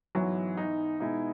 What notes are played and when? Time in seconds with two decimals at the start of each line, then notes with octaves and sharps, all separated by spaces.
0.15 G#2 E3 F#3 B3 E4
0.57 D#4
1.00 B2 G#3 B3 D#4 E4